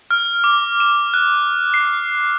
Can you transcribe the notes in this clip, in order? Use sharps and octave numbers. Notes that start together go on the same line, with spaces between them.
F6
D6
E7
F#6
C7